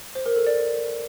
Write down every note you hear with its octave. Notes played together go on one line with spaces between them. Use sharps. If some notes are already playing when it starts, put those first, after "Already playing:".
C5
A#4
A4
D5